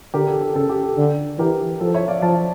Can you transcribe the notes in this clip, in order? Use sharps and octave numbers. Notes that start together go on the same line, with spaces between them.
D3 G4 A#4
A4
A4
C#3 A4
G4
A4
D3
E3 G4 A#4
F3 A4
C#5 E5
D5 F5
F3 F5 A5